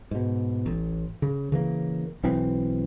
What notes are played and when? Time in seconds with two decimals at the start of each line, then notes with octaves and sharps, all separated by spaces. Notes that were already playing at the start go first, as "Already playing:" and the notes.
0.11 G#2 B2
0.66 A1
1.22 C#3
1.52 C#3 E3 A#3
2.23 B1 E3 C4